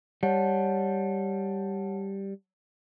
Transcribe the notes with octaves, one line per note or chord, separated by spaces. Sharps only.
G3 C#5 F#5 A5